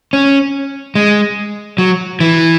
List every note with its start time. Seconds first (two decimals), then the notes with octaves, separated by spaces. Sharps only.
0.13 C#4
0.95 G#3
1.78 F#3
2.20 E3